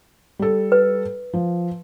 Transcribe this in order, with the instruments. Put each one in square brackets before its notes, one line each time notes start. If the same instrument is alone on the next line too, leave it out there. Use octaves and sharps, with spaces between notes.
[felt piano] G3 A4
[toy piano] B4
[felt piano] F3